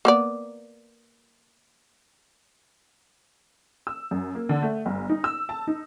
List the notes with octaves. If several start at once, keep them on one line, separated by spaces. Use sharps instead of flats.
A#3 B3 D5
E6
F#2
A#3
D3
A3
G1
D#4
E6
A5
D#4